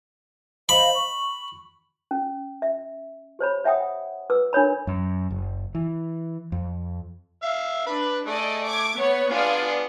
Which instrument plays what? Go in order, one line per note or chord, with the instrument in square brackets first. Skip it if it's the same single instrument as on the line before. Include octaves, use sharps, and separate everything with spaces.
[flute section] C5 D#5 F5 [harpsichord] B5
[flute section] C#6
[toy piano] C#4
E5
G4 C5 C#5 B5
C#5 E5 F#5 G5 D#6
B4 D6 E6
D4 A#4 C#5 B5
[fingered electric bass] F#2
F#1
E3
F2
[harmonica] E5 F5
[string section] D4 [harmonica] B4 B5
[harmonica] A3 [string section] G#4 D5 D#5
[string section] D6 G#6
B3 C#5
[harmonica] B3 D4 [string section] F4 G#4 D5